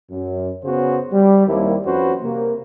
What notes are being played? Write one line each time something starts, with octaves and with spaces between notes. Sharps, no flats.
F#2
C#3 B3 F#4 C5
G3
D#2 G3 A#3 C4 E4
F2 C#4 F#4 B4 C5
C3 A#3